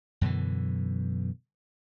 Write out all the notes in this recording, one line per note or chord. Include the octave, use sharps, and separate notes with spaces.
F#2 B2 D3 E3